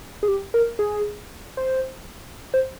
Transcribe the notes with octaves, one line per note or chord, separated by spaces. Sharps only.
G#4
G4
A#4
G#4
C5
C5